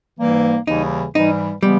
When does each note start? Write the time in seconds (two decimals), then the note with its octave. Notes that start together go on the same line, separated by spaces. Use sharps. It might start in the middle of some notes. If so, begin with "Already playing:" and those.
0.19 G#2 E3 G3 A#3
0.67 D#2 C#3 E3 G3 D#4
1.15 G#2 E3 G3 D#4
1.63 C#3 E3 G3 G#3 B3